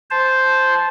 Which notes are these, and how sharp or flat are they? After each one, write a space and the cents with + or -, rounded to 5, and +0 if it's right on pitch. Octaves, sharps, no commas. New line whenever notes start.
C5 +0 A5 -15